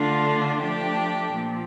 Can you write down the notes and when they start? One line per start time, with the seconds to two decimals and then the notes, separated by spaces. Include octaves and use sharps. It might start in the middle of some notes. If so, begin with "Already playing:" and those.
Already playing: D3 A3 D4 F4
0.61 F3 A3 D4 G4
1.33 A#2 F3